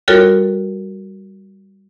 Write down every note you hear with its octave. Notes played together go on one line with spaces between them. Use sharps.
G3 F4 F#4 A4 A#4 C#5